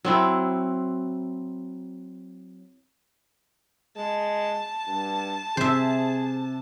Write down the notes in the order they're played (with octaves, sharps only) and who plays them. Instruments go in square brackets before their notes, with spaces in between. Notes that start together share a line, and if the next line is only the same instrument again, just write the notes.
[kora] F#3 C4 E4
[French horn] G#3 [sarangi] A5
[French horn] G2
[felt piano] C3 [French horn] G#4 [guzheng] C5 E5